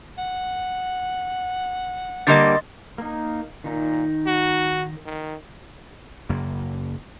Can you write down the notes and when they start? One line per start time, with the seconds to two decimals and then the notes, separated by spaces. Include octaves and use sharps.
0.18 F#5
2.27 D3 G3 A#3 D#5 C6 A6
2.98 A#3 D#4
3.64 A#2 D#3 D#4
4.27 F#4
5.06 D#3
6.29 F#1 F#2 C#3 A#3